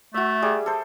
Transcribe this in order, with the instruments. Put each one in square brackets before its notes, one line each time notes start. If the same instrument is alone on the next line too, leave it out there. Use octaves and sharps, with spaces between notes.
[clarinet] A3 [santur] F#4 E5
[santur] G3 G#4
A4 C5